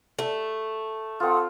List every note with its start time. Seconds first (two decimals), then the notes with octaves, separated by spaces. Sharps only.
0.19 A3
1.20 C4 F4 A4 F#5 D#6